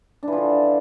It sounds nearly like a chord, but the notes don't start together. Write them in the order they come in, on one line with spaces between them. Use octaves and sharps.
D4 E3 F3 D3